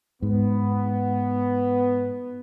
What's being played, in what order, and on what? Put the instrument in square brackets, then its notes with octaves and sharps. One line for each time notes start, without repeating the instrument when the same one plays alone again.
[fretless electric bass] G#2 [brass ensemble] B3